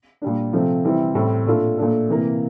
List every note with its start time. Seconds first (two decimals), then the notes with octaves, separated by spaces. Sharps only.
0.22 A#2 G3 D4
0.53 C3 F3 A3 C4 F4
0.84 C3 E3 G3 C4 E4
1.15 A2 G3 C4
1.46 A#2 A3 D4 F4 A4
1.77 A#2 A3 D4 A4
2.09 C3 E3 A#3